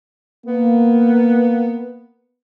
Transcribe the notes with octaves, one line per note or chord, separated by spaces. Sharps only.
A#3 B3